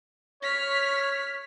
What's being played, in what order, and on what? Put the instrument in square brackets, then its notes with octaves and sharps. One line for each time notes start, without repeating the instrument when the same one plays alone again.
[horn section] C#5 [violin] F6 B6